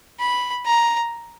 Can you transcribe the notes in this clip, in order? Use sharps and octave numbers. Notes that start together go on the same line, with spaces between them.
B5
A#5